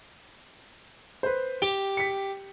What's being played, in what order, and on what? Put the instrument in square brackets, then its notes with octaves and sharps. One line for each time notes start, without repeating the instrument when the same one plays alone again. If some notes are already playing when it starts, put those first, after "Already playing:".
[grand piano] B4 C5
[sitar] G4 [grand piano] D7 G7
[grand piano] B6 C#7